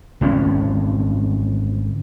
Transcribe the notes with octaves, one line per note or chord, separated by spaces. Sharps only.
G#1 D3 B3 C#4